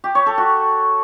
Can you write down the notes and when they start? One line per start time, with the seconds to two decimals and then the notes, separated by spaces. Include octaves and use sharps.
0.04 G4
0.15 C#5
0.26 A4
0.38 F#4